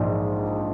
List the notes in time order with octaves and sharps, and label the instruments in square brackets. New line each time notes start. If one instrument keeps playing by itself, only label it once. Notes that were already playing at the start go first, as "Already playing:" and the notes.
Already playing: [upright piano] A#1 G#2 F3